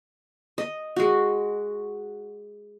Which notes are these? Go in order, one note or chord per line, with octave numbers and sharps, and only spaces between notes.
D#5
G#3 F#4